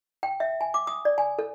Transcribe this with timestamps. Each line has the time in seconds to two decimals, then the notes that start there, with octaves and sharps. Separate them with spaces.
0.23 G5
0.40 E5
0.61 G#5
0.74 D6
0.87 D#6
1.05 D5
1.18 G#5
1.39 A4